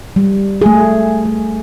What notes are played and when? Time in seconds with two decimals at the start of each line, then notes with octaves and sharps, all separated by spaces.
0.16 G3
0.62 A3 G#4
1.25 A3